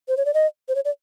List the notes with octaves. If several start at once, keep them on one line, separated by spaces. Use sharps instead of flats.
C5
C#5
D5
D#5
C5
C#5
D5